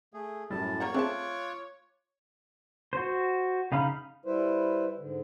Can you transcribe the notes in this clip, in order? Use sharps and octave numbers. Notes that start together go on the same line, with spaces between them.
A3 G#4
F#2 A2 G3 E4 A4 A5
A#3 A#4 C#5 F#5
A3 C4 F4 G#4 E5 A5 D6 F#6
F#4 C5
C#3 D#4 F5 B5 F6
G3 E4 B4 C5
G#2 D3